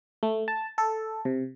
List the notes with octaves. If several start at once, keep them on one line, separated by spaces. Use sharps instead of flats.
A3
A5
A4
C3